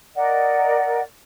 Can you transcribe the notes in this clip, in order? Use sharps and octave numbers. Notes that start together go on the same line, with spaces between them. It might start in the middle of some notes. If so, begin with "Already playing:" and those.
A#4 D5 D#5 F#5